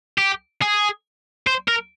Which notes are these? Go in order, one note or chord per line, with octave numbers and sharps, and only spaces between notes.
G4
G#4
C5
A#4